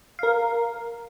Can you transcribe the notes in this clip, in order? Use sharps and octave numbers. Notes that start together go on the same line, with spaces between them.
A#4 F5